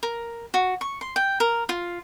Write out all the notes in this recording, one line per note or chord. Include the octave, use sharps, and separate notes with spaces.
A#4
F#4
C#6
C6
G5
A#4
F4